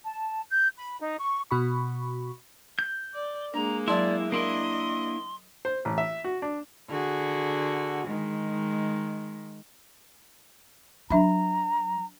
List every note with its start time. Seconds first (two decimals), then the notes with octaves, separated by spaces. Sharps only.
0.05 A5
0.50 G6
0.77 B5
1.01 D#4
1.21 C#6
1.51 B2 F#4 B5 C#6
2.79 G6
3.15 D5
3.54 G#3 A#3 D4 A#5
3.88 F#3 E4 D5 A5 C6
4.32 A#3 D4 E4 A#4 D#5 C6
5.65 C5
5.85 A1
5.98 E5
6.24 F#4
6.42 D4
6.89 D3 F#4 G#4
8.07 D#3 G#3
11.10 F#3 D4 E5 A#5 B5